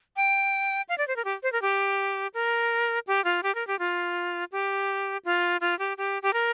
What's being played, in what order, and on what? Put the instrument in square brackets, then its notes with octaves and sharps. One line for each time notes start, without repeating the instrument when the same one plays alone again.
[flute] G5
F5
D5
C5
A#4
G4
C5
A#4
G4
A#4
G4
F4
G4
A#4
G4
F4
G4
F4
F4
G4
G4
G4
A#4